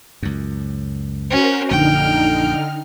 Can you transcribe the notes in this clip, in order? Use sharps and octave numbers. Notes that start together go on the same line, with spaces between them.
C#2 F#2
C#4 F#4 A#4 C5
A#1 F#2 D3 D#4 G5 F6